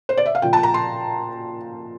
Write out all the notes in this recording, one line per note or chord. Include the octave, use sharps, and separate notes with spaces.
C5
D5
E5
F5
A#2 F3 G5
A5
A#5
C6